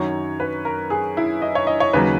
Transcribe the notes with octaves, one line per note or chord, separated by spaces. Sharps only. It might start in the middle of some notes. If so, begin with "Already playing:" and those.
Already playing: F#2 D#3 F#3 C#5
B4
A#4
G#4
E4
D#5
C#5
D#5
C#5
D#2 C#3 F#3 B4